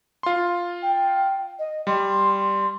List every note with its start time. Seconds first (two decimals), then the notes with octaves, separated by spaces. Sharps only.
0.23 F4 C6
0.82 G5
1.59 D#5
1.87 G3 C6